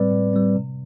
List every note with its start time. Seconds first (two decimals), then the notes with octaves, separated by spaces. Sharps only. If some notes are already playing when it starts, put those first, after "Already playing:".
Already playing: A2 G3 C4 B4 D5
0.11 A2
0.33 G3 C4
0.56 C3